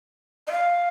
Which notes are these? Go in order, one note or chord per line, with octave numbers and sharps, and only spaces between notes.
D#5
F5